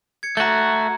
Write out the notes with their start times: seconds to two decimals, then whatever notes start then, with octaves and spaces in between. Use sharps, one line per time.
0.23 G#6 C#7
0.37 A3 F#4 A#5 G#6